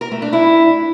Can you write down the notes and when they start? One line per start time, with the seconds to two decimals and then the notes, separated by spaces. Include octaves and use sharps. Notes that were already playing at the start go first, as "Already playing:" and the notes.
0.01 A#4
0.12 A3
0.22 D4
0.33 E4